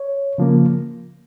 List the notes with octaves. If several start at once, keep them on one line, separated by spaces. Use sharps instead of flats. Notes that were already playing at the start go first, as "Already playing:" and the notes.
Already playing: C#5
C#3 F3 A#3